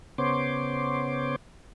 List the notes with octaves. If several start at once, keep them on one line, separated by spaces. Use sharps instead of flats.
C#3 B3 C5 C#5 C6 D6